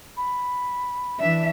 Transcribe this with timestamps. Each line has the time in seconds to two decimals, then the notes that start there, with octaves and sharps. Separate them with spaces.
0.17 B5
1.19 E3 D4 E5